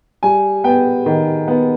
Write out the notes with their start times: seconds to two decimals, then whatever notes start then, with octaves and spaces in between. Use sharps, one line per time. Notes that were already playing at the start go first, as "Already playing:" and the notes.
0.23 G3 G#5
0.64 B3 G5
1.06 D#3
1.48 B3